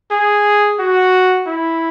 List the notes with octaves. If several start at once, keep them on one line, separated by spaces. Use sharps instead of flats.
G#4
F#4
E4